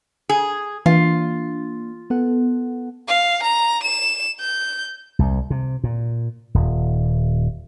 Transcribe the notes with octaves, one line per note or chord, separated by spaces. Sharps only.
G#4
E3 A#3 D4 F4
B3 A4 F#5
F5
A#5
E7
G6
C2
C3
A#2
D#1